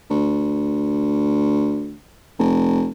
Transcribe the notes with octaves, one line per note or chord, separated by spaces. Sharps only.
D2
F1